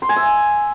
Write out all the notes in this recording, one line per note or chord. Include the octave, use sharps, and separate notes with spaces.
C6
G#5
E5